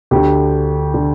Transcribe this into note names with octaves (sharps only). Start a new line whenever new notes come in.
D2 D3 G4
D3